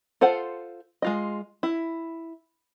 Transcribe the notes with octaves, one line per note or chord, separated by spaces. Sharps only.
F4 A4 C5 F#5
G#3 F4 D#5
E4